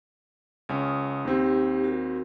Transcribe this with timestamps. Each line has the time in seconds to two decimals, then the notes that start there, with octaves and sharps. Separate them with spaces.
0.69 C#2 C#4 D#6
1.25 D#2 C4 D#4 G4
1.84 F#4 A#4